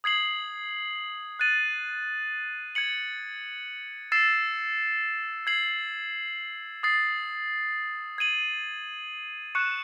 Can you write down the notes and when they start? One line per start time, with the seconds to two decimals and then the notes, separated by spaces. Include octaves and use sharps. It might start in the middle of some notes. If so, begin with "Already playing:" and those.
0.04 D#6 G#6 C7 F#7
1.39 F#6 A6 D#7 F#7
2.75 G#6 C#7 F#7
4.12 E6 A6 C7 E7
5.47 G#6 C7 F#7
6.83 D#6 A6 C7
8.18 G#6 D#7 F#7
9.55 C#6 F#6 C#7 E7